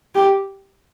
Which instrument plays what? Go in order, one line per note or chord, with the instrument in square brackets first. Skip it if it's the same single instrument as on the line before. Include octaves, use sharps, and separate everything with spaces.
[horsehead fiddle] G4